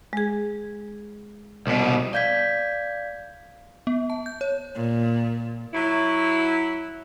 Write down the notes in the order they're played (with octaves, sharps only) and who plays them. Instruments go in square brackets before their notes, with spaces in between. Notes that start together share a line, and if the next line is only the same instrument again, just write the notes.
[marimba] G#3 G#4
[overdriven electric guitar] C2 B2
[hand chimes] D5 F5 G6 G#6 B6
[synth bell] B3
A5
G6
C#5
[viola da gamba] A#2
[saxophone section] F#3 E4